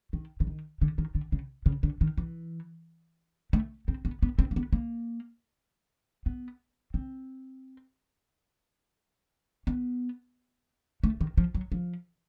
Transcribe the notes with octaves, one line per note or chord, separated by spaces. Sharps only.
D#3
D3
D#3
D3
D#3
D3
C#3
C#3
D3
D#3
E3
A3
C4
B3
B3
C4
A#3
B3
A#3
B3
C4
B3
A3
D#3
F3
F#3
F3